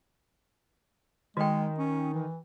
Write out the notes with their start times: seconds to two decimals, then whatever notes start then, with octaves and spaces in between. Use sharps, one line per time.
1.37 D#3 G#3 F#4 G5
1.78 C#4
2.14 E3